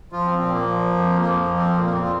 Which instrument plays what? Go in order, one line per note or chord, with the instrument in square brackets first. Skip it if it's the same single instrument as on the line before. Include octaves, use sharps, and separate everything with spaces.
[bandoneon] F3 F4
C4
A#2 C4
A#3
F3
F2
F3 A#3
A#3
F2
C4
A#2 A#3
A#3
C4
A#2 F4